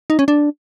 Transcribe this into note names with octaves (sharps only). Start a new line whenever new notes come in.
D#4
C#4
D4